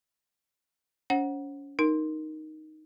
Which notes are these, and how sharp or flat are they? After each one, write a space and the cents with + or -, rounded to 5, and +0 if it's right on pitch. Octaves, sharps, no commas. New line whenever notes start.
C#4 +30 C5 +40 F#5 +0
D#4 +0 A#4 +0